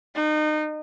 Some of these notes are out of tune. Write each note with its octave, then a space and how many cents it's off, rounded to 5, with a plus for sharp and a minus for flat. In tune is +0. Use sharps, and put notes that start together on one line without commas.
D#4 -30